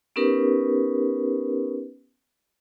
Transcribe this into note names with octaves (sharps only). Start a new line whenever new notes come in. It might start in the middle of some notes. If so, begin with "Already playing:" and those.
B3 C#4 D#4 G4 A#4 B4